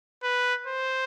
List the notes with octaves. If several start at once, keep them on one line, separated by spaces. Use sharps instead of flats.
B4
C5